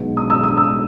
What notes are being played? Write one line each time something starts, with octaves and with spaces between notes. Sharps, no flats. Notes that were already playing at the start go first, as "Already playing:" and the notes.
Already playing: B1 B2 G#3 B3
D#6
E6
D#6
E6